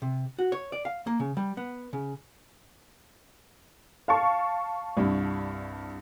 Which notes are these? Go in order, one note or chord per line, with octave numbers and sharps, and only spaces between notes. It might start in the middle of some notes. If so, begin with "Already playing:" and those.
C3
F#4
C#5
D5
F5
A#3
C#3
G3
B3
C#3
F5 A5 C#6
C2 G2